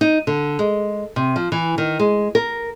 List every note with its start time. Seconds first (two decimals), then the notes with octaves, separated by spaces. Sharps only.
0.01 D#4
0.27 D3
0.59 G#3
1.16 C3
1.36 F3
1.52 E3
1.78 D#3
1.99 G#3
2.35 A#4